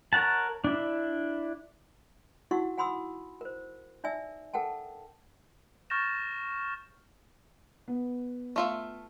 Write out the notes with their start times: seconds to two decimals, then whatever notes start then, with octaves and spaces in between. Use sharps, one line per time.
0.13 A#4 C#5 F#5 A5
0.64 D4 E4
2.51 D#4 E4 F#4 F#5 C#6 E6
2.78 F#5 G#5 B5 C6 D#6 E6
3.41 A#4 C5
4.04 D#4 D5 E5 G#5 E6
4.53 A4 A#4 F#5 G5 A5
5.90 C#6 F6 G6 A6 A#6 E7
7.88 B3
8.56 A3 F4 E5